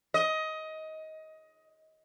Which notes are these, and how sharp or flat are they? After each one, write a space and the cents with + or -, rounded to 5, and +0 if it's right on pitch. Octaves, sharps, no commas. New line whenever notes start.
D#5 +20